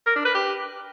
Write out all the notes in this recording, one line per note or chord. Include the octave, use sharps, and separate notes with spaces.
A#4
D4
B4
G4